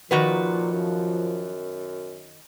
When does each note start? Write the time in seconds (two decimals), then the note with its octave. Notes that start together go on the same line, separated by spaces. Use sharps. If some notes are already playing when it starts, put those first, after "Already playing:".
0.11 A#2 D#3 F3 F#4 B4
0.72 F#2